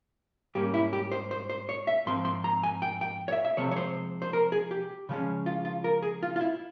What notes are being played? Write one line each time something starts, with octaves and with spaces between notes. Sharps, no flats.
G#2 G3 A#3 C#4 G4
E4
G4
C5
C5
C5
C#5
E5
G#2 F3 C4 C6
C6
A#5
G#5
G5
G5
C#5
E5
E5
C3 F3 G#3 C4 C#5
C#5
C5
C5
A#4
G#4
G4
C#3 F3 G#3 C#4
F4
F4
A#4
G#4
F4
F4
E4